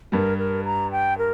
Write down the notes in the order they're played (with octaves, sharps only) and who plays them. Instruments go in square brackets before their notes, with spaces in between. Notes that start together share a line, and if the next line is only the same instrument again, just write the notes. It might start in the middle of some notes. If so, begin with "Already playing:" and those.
[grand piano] G2 G3 [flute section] A#4
[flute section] A#4
A#5
G5
A#4